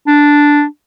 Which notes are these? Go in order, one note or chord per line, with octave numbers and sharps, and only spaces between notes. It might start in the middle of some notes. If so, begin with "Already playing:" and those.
D4